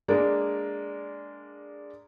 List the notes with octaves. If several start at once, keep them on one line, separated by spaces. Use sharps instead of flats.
G#3 A#3 D4 D5